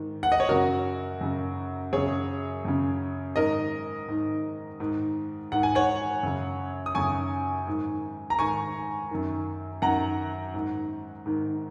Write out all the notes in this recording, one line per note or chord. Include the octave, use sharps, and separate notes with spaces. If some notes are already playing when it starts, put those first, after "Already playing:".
Already playing: G#2 D#3
F#5
D#5
C#5
F#2 C#3 F#4 A#4
F#2 C#3
F#2 C#3 G#4 C#5
F#2 C#3
G#2 D#3 A#4 D#5
G#2 D#3
G#2 D#3
G#2 D#3 F#5
G#5
C#5 F#5
F#2 C#3
D#6
F#2 C#3 G#5 C#6
G#2 D#3
A#5
G#2 D#3 G#5 C#6
F#2 D#3
F#2 D#3 F#5 A#5
G#2 D#3
G#2 D#3